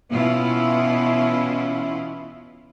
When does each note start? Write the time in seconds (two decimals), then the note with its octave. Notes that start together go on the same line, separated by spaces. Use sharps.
0.11 B2 E3 B3 C#4 E4 F4